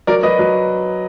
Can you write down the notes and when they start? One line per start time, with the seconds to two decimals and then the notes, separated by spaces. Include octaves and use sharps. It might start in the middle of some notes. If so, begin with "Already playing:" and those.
0.07 F#3 A#4 D5
0.23 F#3 B4 D#5
0.39 F#3